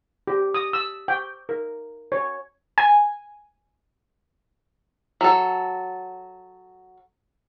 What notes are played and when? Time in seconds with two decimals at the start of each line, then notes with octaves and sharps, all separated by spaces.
0.27 G4
0.54 D#6
0.73 E6
1.08 G5
1.49 A#4
2.12 C#5
2.78 G#5
5.21 F#3 A4